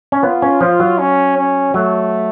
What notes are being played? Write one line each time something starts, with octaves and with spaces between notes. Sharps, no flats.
C#4
B3 F4
C#4
F3
F#3
C#4
C#4
F#3 A3